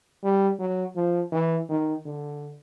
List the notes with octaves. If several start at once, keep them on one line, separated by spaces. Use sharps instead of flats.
G3
F#3
F3
E3
D#3
D3